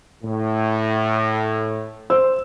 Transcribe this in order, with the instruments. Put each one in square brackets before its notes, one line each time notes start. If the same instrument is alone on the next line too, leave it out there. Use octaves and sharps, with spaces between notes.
[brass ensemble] A2
[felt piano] C5 E6